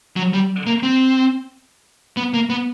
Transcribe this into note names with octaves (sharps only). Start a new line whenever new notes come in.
F#3
G3
A#3
C4
B3
A#3
B3